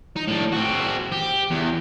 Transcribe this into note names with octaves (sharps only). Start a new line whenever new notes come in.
D#4
A2 D4
C4 F#4
G4
E2